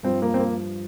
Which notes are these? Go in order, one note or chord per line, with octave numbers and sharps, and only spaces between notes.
G2 F3 C4
A#3
C4
A#3